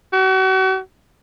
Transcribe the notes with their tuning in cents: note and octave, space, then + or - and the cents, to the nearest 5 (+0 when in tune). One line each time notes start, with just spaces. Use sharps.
F#4 +40